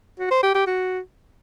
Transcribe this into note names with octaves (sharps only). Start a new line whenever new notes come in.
F#4
C5
G4
G4
F#4